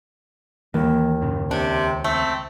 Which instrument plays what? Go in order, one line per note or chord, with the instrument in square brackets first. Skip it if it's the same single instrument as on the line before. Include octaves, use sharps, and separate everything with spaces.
[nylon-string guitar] D#2 [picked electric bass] E3 A#3
[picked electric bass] F#2 A#2 C#3
[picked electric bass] C#2 [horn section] C3 [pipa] D4
[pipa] A3 [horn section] C4